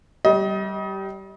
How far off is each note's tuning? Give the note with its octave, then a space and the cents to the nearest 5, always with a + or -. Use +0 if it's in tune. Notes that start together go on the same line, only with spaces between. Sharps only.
G3 -20 D#5 +30